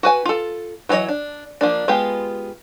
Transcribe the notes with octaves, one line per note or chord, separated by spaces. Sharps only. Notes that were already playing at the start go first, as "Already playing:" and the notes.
F#4 B4 G#5
F4 A4
E3 F#3 D#4 C#5 D#5
D4
F3 A#3 D4
G#3 B3 F4 G4